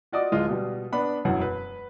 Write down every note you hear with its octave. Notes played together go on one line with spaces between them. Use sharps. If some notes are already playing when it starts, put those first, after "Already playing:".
F4 F#4 D5 D#5 D6 D#6
D1 G#3 F4 D#5
B2 G3
B3 D4 B5
E1 F#2 E3 F#5
B4